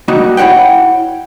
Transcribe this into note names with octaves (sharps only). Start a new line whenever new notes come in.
G3 A#3 D#4 F#4
E4 C#5 E5 F#5 G5